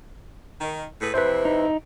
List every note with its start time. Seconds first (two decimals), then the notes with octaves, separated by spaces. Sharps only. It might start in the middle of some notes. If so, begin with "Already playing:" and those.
0.61 D#3
1.01 A2 G#4 B4
1.14 F2 C3 E4 B4 C5
1.45 D#4